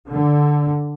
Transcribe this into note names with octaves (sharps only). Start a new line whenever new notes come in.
D3